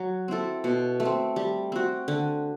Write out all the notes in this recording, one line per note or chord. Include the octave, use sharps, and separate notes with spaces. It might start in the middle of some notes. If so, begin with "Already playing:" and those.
Already playing: F#3
C4 E4 A4
B2
A3
C4
G3
C4 F#4
D3